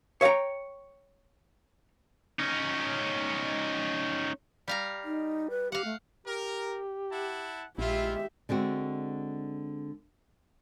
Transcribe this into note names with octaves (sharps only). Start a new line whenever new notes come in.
C#5 E5 F5 G5 A#5
C#4 D#4
G3 F5 A#5
D#4
B4
G4 F5 F#5
A3
G4 A#4
E4 F#5 A5
A#1 G#3 E4 F4 G4 E5
D3 G#3 C4 F#4